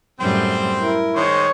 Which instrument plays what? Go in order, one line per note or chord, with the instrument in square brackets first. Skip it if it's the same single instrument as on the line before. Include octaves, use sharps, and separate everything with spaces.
[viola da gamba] F#2 A2 G3 [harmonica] C4 C5
[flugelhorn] E4 [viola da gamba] A#4
[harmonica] D#3 G#3 C5 [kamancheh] C#5